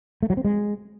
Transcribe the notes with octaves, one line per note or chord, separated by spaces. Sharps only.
A3
F#3
C4
G#3